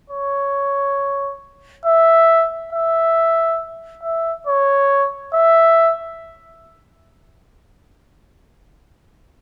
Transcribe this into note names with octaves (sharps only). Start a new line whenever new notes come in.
C#5
E5
E5
E5
C#5
E5